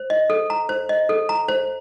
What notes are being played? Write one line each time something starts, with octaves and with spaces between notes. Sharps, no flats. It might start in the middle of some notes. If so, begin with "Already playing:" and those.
Already playing: C5
D#5
A4
A#5
C5
D#5
A4
A#5
C5